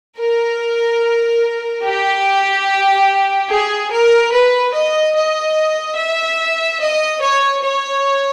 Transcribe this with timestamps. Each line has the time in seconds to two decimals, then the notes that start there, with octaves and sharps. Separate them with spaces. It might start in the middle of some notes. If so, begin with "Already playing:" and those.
0.19 A#4
1.84 G4
3.50 G#4
3.91 A#4
4.32 B4
4.73 D#5
5.15 D#5
5.97 E5
6.80 D#5
7.21 C#5
7.62 C#5